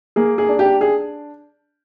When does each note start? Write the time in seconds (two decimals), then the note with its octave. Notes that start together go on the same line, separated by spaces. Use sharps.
0.16 A#3 G#4
0.38 G#4
0.49 D4
0.59 G4
0.81 G#4